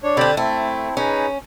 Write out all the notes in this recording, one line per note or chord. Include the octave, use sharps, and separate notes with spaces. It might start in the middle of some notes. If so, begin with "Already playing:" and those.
D4 C#5
D3 C4 D4 G4 B5
A3 C4 E4
C#4 D#4 G#4 B4